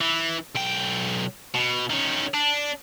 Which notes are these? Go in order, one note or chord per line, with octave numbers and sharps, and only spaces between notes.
E3
B1 G5
B2
D#3 C#4
D4